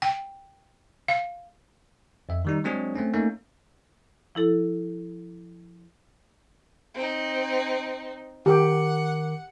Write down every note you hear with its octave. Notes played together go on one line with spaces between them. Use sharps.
G5
F5
F2 E5
D#3 G3 D#4
F#3 G#3 C4 D4 G#4 C#5
A3 C4 C#4
A3 A#3 C#4 D#4
F3 E4 A4
C4 D#4
D#3 G4 A#4 F#5 D6